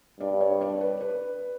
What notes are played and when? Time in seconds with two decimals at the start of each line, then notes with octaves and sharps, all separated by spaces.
0.20 G2 D5
0.41 C#5
0.61 D5
0.81 B4
1.01 B4